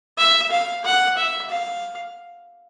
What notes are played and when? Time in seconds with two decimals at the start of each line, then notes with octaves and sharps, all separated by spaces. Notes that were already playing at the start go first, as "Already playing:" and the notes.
0.18 E5
0.51 F5
0.84 F#5
1.17 E5
1.50 F5